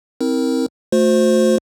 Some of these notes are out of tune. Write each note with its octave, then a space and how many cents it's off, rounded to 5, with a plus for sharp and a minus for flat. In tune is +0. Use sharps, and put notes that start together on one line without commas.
C4 +0 E4 -35 A#4 +0
A3 +0 F#4 -40 C5 +0